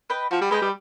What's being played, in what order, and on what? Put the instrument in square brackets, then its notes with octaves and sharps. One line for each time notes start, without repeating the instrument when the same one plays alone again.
[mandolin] B4 D#5 G5
[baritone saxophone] F3 [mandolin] F#4
[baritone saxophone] G3
[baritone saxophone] G#3 [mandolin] B4 D#5 G5
[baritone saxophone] G3